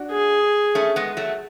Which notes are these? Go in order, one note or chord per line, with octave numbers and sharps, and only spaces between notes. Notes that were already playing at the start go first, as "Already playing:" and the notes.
Already playing: D4 F#4
G#4
A3 C#4
G#3 B3
F#3 A3